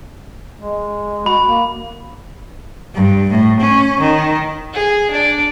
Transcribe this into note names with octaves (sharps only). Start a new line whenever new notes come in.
G#3
F#4 B5
A#3
G2
A2
C#4
D#3
G#4
D4 D5